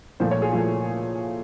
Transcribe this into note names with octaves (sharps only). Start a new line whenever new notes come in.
A#2 F3 A3 C5
C#5
G#4
A#2 F3 A3